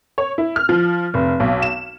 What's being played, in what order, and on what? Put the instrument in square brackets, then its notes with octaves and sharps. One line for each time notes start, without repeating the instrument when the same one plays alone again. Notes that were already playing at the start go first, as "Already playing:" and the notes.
[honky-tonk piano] C#5
E4
F6
F3
F1
B1
E7